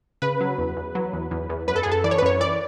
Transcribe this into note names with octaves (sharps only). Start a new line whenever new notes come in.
C#3 B4
F#3
E2
E2
F#3
E2
E2
E2
F#2 B4
A4
F#2 G#4
A4
E3 D5
C#5
B4
F#2 C#5
E3 D5